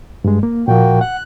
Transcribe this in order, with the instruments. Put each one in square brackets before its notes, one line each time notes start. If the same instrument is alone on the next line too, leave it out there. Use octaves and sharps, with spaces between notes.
[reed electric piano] G2 G#3
A#3
[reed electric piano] A#2 F3 [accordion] A#3 F#4 G5
[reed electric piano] F#5 [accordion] F#6